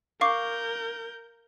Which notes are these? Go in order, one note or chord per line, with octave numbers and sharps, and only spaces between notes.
A#4 F5 C#6 D6 G6